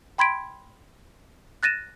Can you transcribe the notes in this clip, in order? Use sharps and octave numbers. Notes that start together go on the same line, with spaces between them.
G5 B5 C6 G#6 B6 D7
F#6 A6 A#6 D#7 E7